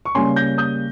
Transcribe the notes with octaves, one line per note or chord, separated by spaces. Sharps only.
C#6
C#3 G3 A#3 C#4 G#5 C6
G6 A#6
D#6 G6